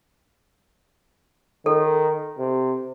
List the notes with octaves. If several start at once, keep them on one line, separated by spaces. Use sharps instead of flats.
D#3 A4
C3